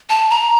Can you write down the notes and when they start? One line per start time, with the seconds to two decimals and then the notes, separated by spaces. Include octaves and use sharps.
0.10 A5
0.30 A#5